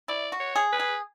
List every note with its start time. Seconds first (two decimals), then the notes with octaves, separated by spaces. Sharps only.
0.08 E4 D5
0.32 F#4
0.40 C#5
0.56 G#4
0.72 B4
0.79 G#4